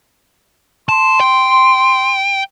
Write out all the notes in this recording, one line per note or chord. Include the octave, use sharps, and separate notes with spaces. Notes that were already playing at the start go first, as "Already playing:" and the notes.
A5 C6
G5